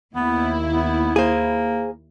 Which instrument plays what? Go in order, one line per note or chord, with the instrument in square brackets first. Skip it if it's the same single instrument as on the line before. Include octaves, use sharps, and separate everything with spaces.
[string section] D#2 E4 [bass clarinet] B3
[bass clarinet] B3
[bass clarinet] A#3 [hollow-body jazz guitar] G#4 C5